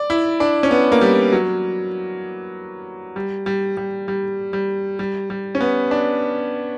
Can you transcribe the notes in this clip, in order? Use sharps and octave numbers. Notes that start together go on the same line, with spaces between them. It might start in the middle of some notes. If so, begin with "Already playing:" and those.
Already playing: D5
E4
D4
C#4
B3
A#3
G3
F#3
G3
G3
G3
G3
G3
G3
G3
C#4
B3
D4